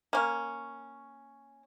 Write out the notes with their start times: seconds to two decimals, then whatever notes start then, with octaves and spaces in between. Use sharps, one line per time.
0.13 A#3 C#4